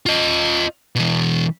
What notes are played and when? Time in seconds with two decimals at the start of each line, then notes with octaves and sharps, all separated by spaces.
0.06 F4 D#5
0.96 B2 E3